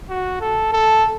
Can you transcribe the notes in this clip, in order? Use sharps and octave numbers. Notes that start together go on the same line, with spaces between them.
F#4
A4
A4